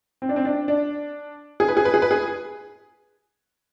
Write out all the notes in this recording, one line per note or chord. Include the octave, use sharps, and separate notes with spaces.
C4
D4
C4
D4
D4
G#4
B4
G#4
B4
G#4
B4
G#4